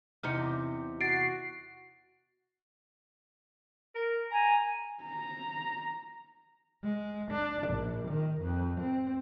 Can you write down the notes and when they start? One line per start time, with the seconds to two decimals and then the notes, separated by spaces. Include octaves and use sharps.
0.23 E2 C3 D#4 F6 C#7
1.01 F#4 A6 C7 D7
3.95 A#4
4.31 G#5 A#5
5.04 A#5
6.83 G#3
7.31 D4
7.68 A#1
8.08 D#3
8.41 F2
8.80 C4